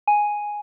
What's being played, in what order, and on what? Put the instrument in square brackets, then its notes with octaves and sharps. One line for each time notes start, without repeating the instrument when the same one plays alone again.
[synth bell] G#5